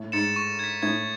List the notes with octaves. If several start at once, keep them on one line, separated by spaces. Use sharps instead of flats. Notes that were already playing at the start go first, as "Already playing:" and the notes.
Already playing: A2
G#2 A6 C#7 E7
C#6
G#6 B6
A2 G#6